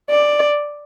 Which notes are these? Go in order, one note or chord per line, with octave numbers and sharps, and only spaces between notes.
D5